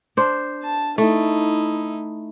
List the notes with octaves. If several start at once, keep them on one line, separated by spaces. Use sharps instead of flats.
D4 C5
A5
A3 D#4 E4